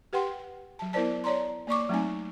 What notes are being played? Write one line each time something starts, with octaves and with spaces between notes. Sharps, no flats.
G4 B4 F#5 G5 C6
F#3 A5
B3 E4 A#4 C5 D5 A5
C#5 D5 A#5 C6
A#3 D5 C#6 D6
F#3 A3 C4 D#4 G#5